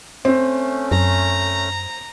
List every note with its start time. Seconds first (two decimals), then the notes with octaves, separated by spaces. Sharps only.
0.25 A3 C4 C#4
0.92 F#2 A#5